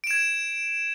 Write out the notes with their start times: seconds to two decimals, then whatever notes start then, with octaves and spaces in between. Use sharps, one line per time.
0.04 D7
0.07 E7
0.11 G#6